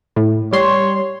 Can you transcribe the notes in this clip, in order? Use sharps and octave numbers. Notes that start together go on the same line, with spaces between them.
A2
G3 C#5 C6